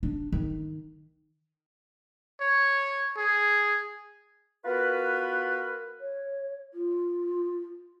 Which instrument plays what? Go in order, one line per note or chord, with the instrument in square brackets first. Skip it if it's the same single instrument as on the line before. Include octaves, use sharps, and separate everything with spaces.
[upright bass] D4
D#3
[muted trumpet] C#5
G#4
[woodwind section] B3 F4 F#4 A#4 B4
[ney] C#5
F4